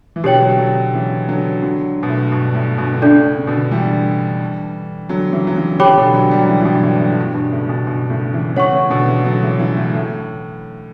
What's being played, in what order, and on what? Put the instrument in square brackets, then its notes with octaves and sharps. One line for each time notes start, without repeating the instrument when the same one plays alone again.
[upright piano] E3
[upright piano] B2 D3 [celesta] G4 C#5 G5
[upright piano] D3 F#3
D3 F#3
C#3 E3
D3 F#3
D3 F#3
B2
A2
G2 B2
A2
G2 B2
D3
[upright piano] A2 C#3 [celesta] D4 A4 D5
[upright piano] C#3
B2 D3
E3 G3
D3 F#3
C#3 E3
F#3
C#3 E3
[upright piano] D3 [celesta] G4 C#5 G5 B5 D6
[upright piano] E3
B2 D3
D3 F#3
G3
F#3
C#3 E3
E3
B2 D3
G2
A2
A2
A2
G2
G2 B2
A2 C#3
G2 B2
G2 B2
A2 C#3
C#3 E3
[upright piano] C#3 E3 [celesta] C#5 F#5 C#6
[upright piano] A2
B2 D3
C#3 E3
D3 F#3
C#3 E3
C#3 E3
A2
A2